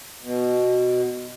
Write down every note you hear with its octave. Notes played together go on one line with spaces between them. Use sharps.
B2